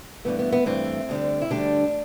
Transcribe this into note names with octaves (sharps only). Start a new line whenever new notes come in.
G2 E3 A3 B3
B3
B3
G2 E3 A3 C4
D2 D3 G3
E4
D2 D3 G3 D4